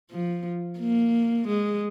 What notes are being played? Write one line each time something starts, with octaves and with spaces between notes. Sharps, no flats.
F3
A#3
G#3